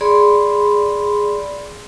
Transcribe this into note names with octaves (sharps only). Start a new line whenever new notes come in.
G#4 D5 B5 C6